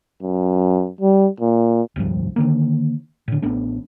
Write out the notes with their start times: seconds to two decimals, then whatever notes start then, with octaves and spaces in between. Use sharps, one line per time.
0.22 F#2
1.00 G3
1.40 A#2
1.96 D1 C2 G2 F3
2.36 D3 D#3 A#3
3.28 A2 D3
3.42 A1 A3 B3 D4